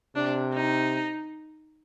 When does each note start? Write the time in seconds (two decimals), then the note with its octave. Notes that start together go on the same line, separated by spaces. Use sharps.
0.16 C3 D4
0.54 D#4